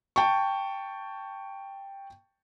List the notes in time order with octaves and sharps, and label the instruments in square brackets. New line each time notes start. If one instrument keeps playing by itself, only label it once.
[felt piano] G5 A5 C#6